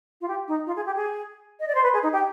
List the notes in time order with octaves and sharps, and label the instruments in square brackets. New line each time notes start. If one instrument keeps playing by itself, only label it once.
[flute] F4
G4
D#4
F4
G#4
G4
G#4
D#5
D5
C5
B4
G#4
D#4
G4